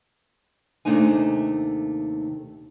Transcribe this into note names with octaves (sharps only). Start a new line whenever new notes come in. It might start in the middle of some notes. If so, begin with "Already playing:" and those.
D#2 C3 A3 D4 D#4 G#5